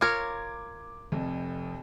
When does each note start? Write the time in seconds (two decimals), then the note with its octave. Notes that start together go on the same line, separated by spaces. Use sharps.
0.01 F4 A#4 C#5 D6 G#6
1.12 F1 F2